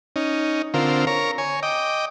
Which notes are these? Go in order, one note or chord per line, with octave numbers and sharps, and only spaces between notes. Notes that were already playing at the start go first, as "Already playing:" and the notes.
C#4 D#4
D3 C4 F4 A#4
A#4 C#5 A#5
C#5 G#5
D#5 G5 D6